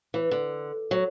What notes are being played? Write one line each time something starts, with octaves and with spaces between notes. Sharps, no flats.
E3
D3
F#3